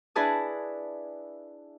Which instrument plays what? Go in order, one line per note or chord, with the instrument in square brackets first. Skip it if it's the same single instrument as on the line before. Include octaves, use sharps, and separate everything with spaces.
[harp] D4 E4 G#4 B4 A5 D#6